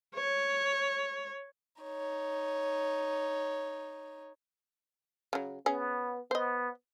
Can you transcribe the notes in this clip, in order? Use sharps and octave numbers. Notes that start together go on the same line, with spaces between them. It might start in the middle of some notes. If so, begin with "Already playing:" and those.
C#5
D#4 C#5
C#3 F#3
B3 C#4 G#4
B3 C5 D#5